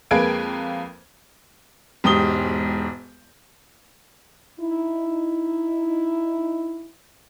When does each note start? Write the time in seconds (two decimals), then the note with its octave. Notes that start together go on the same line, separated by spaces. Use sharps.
0.11 F2 G#3 A#3 B4 G#6 D7
2.04 E1 G#2 G4 D#6 G7
4.59 D#4 E4